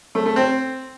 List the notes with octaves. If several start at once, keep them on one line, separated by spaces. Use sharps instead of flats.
A3
A3
C4